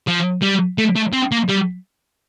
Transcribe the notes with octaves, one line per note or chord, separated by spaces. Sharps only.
F3
G3
A3
A3
C4
A#3
G3